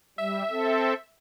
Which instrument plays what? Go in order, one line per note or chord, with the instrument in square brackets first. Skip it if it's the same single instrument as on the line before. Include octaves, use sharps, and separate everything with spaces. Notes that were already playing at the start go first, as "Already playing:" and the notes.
[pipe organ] G3 [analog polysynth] E5
[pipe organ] C4 A4